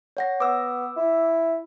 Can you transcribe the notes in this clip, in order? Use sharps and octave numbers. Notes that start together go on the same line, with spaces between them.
C#5 F#5 A#6
B3 D6 E6
E4